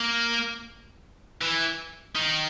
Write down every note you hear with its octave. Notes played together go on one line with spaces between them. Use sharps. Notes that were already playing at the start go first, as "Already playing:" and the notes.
Already playing: A#3
E3
D#3